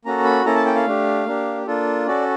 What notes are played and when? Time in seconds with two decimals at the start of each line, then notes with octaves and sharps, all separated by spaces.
0.05 A#3 C#4 F#4 A4 A#5
0.25 B5
0.45 A#3 C#4 E4 A4 A#5
0.56 A5
0.66 G5
0.75 F5
0.86 A3 D4 G4
1.26 A#3 D4 G4
1.67 A#3 D4 F4 A4
2.07 C#4 F#4 A4 D5